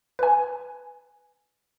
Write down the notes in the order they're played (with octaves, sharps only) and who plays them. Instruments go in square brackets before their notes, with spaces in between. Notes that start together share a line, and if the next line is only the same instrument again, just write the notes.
[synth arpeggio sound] B4 G#5